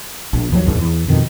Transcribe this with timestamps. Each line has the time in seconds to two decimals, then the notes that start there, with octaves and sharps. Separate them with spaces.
0.33 A#1 A#3
0.52 D#2 F3 F#3 A#3
0.66 A#1 D#2 G#2
0.79 E2
1.08 F2 B2 D#3